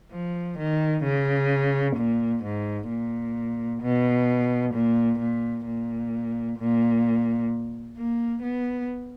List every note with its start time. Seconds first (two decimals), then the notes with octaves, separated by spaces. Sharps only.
0.12 F3
0.59 D#3
1.04 C#3
1.96 A#2
2.43 G#2
2.89 A#2
3.82 B2
4.74 A#2
5.20 A#2
5.66 A#2
6.59 A#2
7.98 A#3
8.43 B3